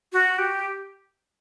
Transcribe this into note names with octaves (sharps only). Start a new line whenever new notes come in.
F#4
G4